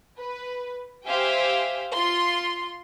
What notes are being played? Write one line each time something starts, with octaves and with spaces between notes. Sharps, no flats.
B4
G4 C5 E5 F5 G5 G#5
F4 C6